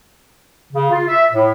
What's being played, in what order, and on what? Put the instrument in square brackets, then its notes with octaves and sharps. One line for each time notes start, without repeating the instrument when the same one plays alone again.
[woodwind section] C#3
F4
E5
A2